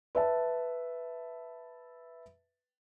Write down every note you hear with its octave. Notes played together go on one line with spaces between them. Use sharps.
B4 E5 A5